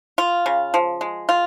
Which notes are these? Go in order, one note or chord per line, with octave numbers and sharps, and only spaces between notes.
F4
C#3
F3
G#3
F4